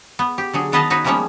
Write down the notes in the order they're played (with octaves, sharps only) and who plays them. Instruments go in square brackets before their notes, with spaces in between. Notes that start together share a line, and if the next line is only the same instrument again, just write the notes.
[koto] B3
G4
D3 F#3 G#4
D#3 B3 B4 D#5 F5 A5
D#4 F#4 B4 C#5
F3 G3 G#3 A#3 B3 C#4